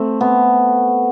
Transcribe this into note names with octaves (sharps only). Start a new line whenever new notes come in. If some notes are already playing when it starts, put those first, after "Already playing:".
Already playing: A3 C4
B3